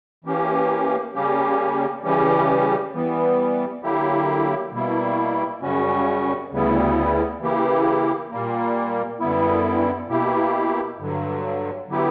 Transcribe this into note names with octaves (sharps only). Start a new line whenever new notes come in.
E3 A#3 C#4 G4
C#3 G3 A#3 C#4 G4
C#3 E3 G3 C#4 G4
E3 G3 B3
D3 F#3 A#3 E4 G4
B2 G3 A#3 E4
F#2 C#3 G3 C#4 F#4
D2 C#3 G3 B3 E4
C#3 E3 A#3 E4 G4
A#2 G3 A#3
F#2 D3 G3 B3 E4
B2 A#3 E4 G4
G2 D3 F#3
D3 F#3 B3 E4 G4